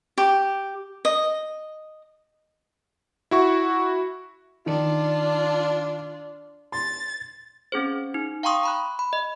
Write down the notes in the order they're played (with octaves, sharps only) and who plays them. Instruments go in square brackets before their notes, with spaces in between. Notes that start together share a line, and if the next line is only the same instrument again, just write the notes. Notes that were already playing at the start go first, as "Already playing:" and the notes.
[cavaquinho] G4
D#5
[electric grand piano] E4 F#4 C#6
[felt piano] D#3 [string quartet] D4 F4
[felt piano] C6 [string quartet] A6
[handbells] C4 C#4 G#4 C5
D#4
F5 G5 A#5 C6 C#6 D#6
A#5 B5 F#6
B5
D#5